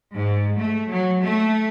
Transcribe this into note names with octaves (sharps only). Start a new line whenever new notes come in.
G#2
A3
F#3
A3